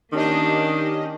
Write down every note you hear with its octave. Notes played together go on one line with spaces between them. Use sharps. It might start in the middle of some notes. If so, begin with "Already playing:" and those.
D#3 A#3 C#4 D4 G4 D#5